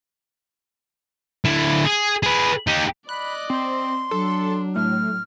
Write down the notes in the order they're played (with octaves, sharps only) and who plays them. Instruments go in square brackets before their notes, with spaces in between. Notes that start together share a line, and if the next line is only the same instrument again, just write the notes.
[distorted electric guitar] D3 E4
G#4
G#4 B4
D#4 G4
[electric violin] D5 D#5 [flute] B5 [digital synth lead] F#6
[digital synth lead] C4 [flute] C6
[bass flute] F#3 [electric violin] D4 [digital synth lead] A4
[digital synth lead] A2 [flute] F6